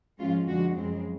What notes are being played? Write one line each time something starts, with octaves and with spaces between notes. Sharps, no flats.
G#2 F3 G#3 C#4 F4
F2 D3 F3 G#3 F#4
F#2 C#3 F3 G#3 C4